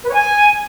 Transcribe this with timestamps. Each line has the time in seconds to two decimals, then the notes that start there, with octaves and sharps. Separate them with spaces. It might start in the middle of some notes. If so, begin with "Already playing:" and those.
0.04 B4
0.09 C#5
0.14 G#5